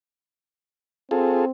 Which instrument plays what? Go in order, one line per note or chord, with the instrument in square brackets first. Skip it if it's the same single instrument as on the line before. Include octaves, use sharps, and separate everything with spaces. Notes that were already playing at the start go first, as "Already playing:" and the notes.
[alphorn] C4 [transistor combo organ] F4 G#4 A4